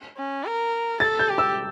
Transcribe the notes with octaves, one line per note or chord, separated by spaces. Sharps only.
C#4
A#4
A4 A6
G6
G4
E6